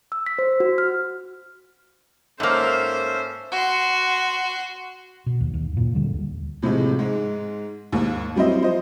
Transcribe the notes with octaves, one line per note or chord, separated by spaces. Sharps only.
E6
B6
C5
F#4
F6
G#2 A#3 C#4 A4 C5 E5
F#4 C6
B2
D#2
D#2
F#2 A#2
D#2 D3 G3
D#2
A2 C3 F3 G#3 F4
G#2 G#3
D#2 G#2
F#3 G3 C4 E4 C5 D#5
F3 C5 D#5